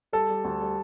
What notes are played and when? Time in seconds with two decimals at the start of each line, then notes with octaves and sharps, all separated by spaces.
0.13 G3 A4
0.29 G3
0.44 D2
0.61 G3